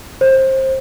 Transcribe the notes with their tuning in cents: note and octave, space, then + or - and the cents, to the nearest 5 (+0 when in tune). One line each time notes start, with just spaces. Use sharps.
C5 +25